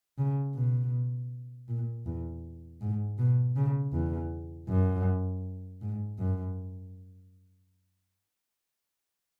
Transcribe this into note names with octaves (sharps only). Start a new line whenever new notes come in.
C#3
B2
A#2
E2
G#2
B2
C#3
E2
F#2
G#2
F#2